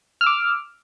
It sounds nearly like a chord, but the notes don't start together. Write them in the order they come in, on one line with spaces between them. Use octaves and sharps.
F6 E6 D6